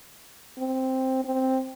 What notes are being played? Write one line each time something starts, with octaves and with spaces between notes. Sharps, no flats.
C4
C4